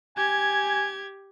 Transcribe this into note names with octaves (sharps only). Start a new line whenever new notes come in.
G4 G#5 G#6